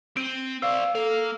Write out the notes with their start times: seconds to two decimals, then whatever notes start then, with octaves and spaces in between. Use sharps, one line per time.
0.17 C4 D7 D#7
0.62 C5 D5 F5 E6
0.95 A#3 A4 F5